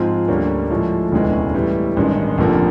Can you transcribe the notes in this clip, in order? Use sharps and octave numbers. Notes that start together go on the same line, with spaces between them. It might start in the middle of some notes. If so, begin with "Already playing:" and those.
Already playing: G#2 F3 G#3 C4 F4
D2 D3 G3 A#3 C#4
A2 F3 G#3
E1 D2 C#3 E3 G#3
A2 E3 G3
A1 G2 D#3 G#3
F1 F2 D3 F3 A#3